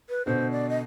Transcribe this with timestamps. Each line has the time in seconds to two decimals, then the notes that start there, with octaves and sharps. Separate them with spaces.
0.10 B4
0.26 B2 D3 C5
0.51 D5
0.69 D#5